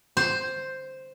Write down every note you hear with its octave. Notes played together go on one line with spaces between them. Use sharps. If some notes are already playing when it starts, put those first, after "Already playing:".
C5